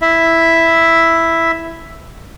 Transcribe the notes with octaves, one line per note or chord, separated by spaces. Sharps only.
E4 E5